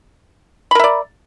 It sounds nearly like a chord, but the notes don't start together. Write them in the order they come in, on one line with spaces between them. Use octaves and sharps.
B5 A#4 E5 D5